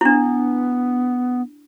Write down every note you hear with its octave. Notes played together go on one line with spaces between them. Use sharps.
B3 D4 E4